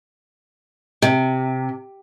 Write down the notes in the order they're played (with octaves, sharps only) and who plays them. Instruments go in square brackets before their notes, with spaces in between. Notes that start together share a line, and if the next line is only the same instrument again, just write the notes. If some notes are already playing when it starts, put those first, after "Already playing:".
[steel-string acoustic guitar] C3